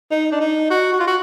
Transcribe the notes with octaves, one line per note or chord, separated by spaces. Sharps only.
D#4
D4
D#4
F#4
F#4
F4
F#4